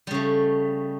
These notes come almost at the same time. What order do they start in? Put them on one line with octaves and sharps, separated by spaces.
G3 C#3 A3